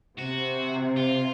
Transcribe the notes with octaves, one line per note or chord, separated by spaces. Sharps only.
C3 F#4
F4